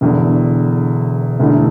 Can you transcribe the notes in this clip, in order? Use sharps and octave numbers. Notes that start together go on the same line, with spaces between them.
E1 E2 D3
E1 D2 D3 A3 E4